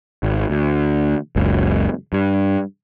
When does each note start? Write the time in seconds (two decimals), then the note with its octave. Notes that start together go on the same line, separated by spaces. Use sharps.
0.23 G#1
0.50 D2
1.36 F#1 C#2
2.13 G2